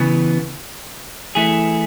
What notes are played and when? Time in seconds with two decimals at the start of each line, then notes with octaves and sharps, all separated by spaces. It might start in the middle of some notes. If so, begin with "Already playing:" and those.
Already playing: C#3 E3 B3
1.35 E3 A3 E4 G#4